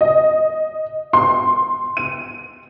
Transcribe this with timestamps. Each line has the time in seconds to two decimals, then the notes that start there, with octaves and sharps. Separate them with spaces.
0.01 D#5
1.13 C6
1.97 D#7